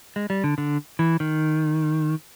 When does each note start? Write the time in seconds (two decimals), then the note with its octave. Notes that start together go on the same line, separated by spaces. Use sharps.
0.16 G#3
0.30 G3
0.44 D3
0.58 D3
0.99 E3
1.20 D#3